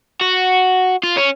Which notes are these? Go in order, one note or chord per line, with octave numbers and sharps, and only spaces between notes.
F#4
F4
C#4